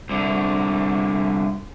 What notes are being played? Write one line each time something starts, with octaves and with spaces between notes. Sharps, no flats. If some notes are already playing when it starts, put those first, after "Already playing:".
C2 D3